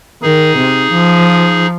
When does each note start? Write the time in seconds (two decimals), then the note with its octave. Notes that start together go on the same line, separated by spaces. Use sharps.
0.22 D#3 D#4 G#4
0.57 C3
0.92 F3